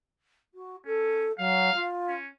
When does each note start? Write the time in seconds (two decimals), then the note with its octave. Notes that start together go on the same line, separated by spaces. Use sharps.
0.55 F#4
0.86 C#4 A4
1.39 F#3 F5
1.75 F4
2.08 C#4